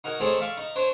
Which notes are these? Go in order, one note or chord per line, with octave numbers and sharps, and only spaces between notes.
D#4 F#4 A#4 G#5
A3 C4 D#4 G#4 A4 C#5
D5 E5 F5 C#6
D#4
D4 C5 C#5